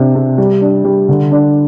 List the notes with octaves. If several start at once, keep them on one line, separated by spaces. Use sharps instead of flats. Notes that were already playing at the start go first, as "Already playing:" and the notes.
Already playing: C3 D4
C3
G3
D4
G3
D3
D4